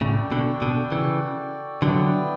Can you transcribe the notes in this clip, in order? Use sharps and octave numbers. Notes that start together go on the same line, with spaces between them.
A2 C#3 F#4 A4 D5 G5
B2 D3
B2 D3
C#3 E3
D3 F#3 B3 E4 B4 D5 G5